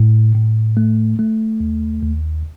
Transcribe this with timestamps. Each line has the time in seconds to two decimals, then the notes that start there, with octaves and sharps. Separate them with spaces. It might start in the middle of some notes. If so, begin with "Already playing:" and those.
Already playing: A2
0.35 A2
0.77 A3
1.19 A3
1.60 D#2
2.03 D#2